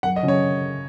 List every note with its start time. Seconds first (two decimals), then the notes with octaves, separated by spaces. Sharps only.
0.03 F#2 F#5
0.16 D#5
0.23 C#3 F#3 C#4
0.28 C#5